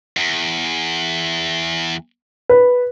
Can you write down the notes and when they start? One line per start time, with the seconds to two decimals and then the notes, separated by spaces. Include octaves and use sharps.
0.17 E2
2.49 B4